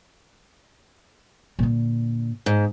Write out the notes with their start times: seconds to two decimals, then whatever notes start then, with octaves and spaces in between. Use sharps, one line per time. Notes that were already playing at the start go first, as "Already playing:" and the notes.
1.59 A#2 D3
2.46 G#2